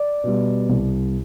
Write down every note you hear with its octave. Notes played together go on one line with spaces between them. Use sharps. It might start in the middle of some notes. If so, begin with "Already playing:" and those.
Already playing: D5
B2 G3
C2